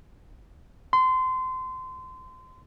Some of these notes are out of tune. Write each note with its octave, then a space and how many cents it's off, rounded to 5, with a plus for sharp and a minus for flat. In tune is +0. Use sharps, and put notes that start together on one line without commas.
C6 -25